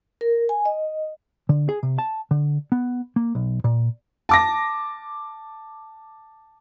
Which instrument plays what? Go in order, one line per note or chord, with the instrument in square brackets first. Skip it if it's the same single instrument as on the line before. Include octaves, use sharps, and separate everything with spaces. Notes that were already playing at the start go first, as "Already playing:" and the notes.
[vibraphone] A#4
G#5
D#5
[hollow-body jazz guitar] D3
G#4
C3
A5
D3
B3
A#3
B1
A#2
[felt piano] A5 D6 A#6